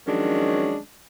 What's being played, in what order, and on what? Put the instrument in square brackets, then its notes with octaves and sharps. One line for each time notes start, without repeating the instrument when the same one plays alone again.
[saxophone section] D#3 F3 F#3 G#3 C#4 D4